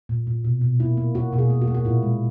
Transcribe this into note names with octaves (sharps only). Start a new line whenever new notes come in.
A#2
A#2
B2
B2
A#3 E4
A#3
A#3 F#4
B2 F#4
G#4
A#3
F#4
A#3
F#4
A#2 E4
G#3